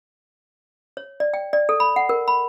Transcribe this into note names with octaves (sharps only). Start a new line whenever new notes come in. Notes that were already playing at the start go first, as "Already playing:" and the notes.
C#5
D5
G5
D5
A4
B5
F#5
A#4
B5